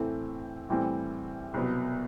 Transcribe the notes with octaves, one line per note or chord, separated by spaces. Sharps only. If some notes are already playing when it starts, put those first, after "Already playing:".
Already playing: A2 E3 A3 C4
A2 E3 G3 C4
C2 B2 F#3 B3